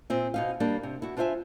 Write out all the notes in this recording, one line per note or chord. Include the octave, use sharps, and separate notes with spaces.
A#2 C4 E5
B2 D#4 F5
G3 A#3 D4
C3
E4 F#4
D4 F4 C5 D5 E5 G#5